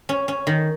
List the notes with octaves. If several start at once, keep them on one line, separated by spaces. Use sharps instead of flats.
C#4
C#4
D#3